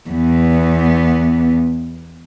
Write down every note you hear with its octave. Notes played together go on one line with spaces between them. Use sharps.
E2 B3